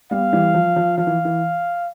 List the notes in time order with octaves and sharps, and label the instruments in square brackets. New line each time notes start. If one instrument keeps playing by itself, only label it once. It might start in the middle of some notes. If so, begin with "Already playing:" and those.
[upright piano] G3 B3 [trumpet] F5
[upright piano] E3 G3
F3
F3
[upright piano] F3 [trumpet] F5
[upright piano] E3
E3